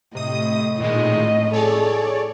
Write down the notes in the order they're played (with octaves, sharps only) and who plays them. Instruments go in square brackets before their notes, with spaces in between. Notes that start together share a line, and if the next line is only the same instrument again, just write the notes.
[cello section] A2 [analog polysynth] C3 D#6 [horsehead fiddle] D#5
[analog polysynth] A#2 D#3 G#3 [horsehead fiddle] D#5
[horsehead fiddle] G#4 A4 [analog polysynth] C#5 D5